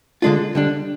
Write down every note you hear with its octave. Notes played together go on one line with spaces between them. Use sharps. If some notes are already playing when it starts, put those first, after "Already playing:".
D3 G#3 D4 F4
D3 G3 D4